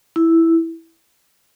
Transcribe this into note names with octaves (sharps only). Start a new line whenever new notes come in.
E4